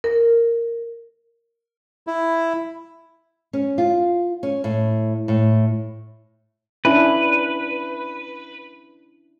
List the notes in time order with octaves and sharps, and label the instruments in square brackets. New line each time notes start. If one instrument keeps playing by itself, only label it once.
[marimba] A#4
[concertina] E4
[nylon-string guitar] C#4
F4
C#4
A2
A2
[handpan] C#4 D4 E4 [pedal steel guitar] B4